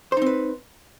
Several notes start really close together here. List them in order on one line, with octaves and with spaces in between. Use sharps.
C5 D#4 C4 B4